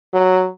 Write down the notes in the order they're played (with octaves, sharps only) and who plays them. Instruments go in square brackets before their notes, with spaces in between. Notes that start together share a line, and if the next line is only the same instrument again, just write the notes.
[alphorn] F#3